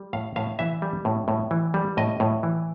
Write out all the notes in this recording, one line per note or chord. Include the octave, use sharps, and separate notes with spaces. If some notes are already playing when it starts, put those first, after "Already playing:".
Already playing: G3
A2 F5
A2 F5
E3 E5
G3
A2
A2
E3
G3
A2 D#5
A2
E3